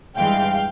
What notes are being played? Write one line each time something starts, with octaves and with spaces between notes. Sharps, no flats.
G2 E3 G#3 F5 G5